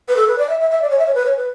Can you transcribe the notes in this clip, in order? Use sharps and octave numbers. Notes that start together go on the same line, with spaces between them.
B4
A4
B4
D5
E5
E5
E5
D5
C#5
E5
C#5
B4
C#5
B4